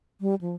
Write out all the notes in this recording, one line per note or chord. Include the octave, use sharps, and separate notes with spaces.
G3
F3